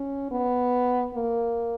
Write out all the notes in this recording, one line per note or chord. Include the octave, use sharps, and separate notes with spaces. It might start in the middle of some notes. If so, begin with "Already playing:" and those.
Already playing: C#4
B3
A#3